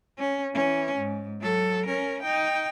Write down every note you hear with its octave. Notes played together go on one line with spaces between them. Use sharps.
C#4
E3 C#4
G#2
F#3 A4
C#4 A#4
D#4 G5